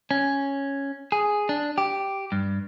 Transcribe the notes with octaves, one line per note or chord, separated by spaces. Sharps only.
C#4
G#4
D4
G4
G2